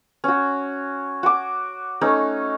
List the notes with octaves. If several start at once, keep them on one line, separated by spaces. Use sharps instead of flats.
C#4 F#4
F#4 D6
A3 C#4 D#4